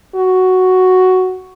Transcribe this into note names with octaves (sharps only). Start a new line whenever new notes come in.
F#4